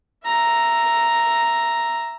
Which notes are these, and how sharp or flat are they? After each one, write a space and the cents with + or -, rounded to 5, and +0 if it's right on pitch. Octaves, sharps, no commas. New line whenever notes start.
E5 +15 A#5 +0